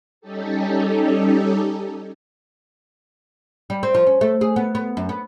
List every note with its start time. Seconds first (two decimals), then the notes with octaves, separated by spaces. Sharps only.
0.21 G3 C#4 D#4 G4 A4
3.70 G3
3.83 C4
3.95 F3
4.07 C#4
4.21 A3
4.41 G#4
4.56 B3
4.75 B3
4.97 F#2
5.09 B3